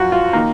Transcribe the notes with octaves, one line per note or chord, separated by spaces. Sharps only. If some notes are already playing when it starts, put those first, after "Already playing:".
Already playing: F#2 F3 F4 F#4
F4
D#3 A#3